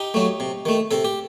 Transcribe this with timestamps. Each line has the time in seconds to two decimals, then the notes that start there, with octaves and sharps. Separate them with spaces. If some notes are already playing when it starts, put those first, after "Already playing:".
Already playing: D#4 G4
0.14 F#3 A3
0.40 C3
0.66 D#3 A3
0.91 C3 A4
1.05 G4